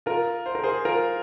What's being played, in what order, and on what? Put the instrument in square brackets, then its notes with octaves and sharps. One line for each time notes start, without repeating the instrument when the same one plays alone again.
[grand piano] F4 A#4
C5
A#4
G#4 C5
F4 A#4